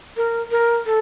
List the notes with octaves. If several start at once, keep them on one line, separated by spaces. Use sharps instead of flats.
A#4
A#4
A4